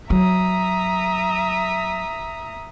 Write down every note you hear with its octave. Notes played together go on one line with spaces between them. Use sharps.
F#3 E5 A#5 D#6